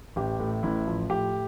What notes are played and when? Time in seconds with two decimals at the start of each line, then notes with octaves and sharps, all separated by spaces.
0.16 A1 G4
0.40 A2
0.63 A1 E4
0.87 F3
1.10 A2 G4